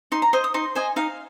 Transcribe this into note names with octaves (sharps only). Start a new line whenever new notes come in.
D#4 C6
A#5
C5 D#5 C6
D#6
D#4 C6
C5 D#5 G#5
D#4 F5